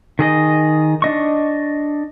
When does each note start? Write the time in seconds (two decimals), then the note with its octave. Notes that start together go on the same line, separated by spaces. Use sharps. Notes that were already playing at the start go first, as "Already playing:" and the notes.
0.19 D#3 G#4 D#5
1.02 D4 D#5 C#6